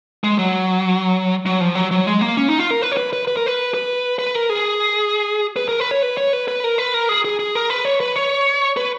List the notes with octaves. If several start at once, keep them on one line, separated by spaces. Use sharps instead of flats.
G#3
F#3
F#3
F3
F#3
F#3
G#3
A#3
C#4
D#4
F4
A#4
B4
C#5
B4
B4
B4
A#4
B4
B4
B4
A#4
G#4
B4
A#4
B4
C#5
B4
C#5
B4
B4
A#4
B4
A#4
G#4
G#4
G#4
A#4
B4
C#5
B4
C#5
B4